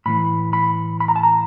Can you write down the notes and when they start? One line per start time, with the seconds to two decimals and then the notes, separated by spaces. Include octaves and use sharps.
0.06 A2 E3 A3 B5
0.53 B5
1.00 B5
1.08 A#5
1.16 A5
1.23 A#5